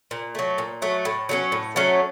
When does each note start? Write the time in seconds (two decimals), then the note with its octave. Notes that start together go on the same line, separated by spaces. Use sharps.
0.11 A#2
0.35 F#3 A3
0.58 A#2
0.82 F#3 A3
1.05 A2
1.29 F#3 A3 C#4
1.52 A2
1.76 F#3 A3 C#4